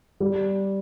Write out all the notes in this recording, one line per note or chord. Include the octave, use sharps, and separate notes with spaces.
G3